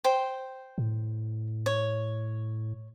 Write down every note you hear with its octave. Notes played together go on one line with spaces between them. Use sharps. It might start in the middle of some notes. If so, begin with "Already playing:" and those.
C5 G5
A2
C#5